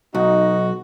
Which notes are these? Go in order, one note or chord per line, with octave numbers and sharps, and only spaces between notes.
B1 D#4 F#4 D#5